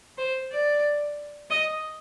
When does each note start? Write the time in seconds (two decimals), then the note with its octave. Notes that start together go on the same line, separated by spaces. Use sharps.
0.18 C5
0.51 D5
1.50 D#5